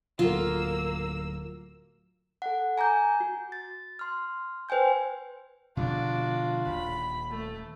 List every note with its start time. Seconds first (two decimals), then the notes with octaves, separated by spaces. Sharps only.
0.19 D1 A#3 F4 F#4 A4 E6
2.42 A4 F#5
2.78 G#5 A#5 D6 G6
3.20 F#4
3.52 A6
3.99 C6 F6
4.69 B4 C5 G5 G#5 G6
5.77 B2 D3 F3 D4 F4 F#4
6.66 D#1 B5
7.30 A3